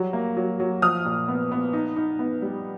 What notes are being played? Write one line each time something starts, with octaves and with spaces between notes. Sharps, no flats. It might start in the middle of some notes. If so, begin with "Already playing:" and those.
Already playing: F#3 G3
A#3
F#3
F#3
F3 D#6 F6
A#2
B3
B3
D#4
D#4
B3
G3